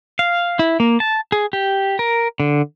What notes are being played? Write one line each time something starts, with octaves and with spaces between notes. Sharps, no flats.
F5
E4
A#3
A5
G#4
G4
A#4
D3